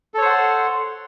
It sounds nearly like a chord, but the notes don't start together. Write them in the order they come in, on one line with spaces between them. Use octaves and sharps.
A4 C#5 C5 F#5 C6